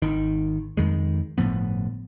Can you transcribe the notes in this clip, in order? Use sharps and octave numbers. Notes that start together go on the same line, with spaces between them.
G#1 D#3
F2 D#3 G#3
G1 A2 F3 B3